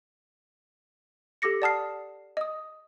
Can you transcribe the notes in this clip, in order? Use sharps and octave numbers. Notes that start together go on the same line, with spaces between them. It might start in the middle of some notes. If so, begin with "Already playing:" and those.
G4 A4 D6 A#6 C#7
D5 F#5 A5 D#6 F6 C7
D#5 D#6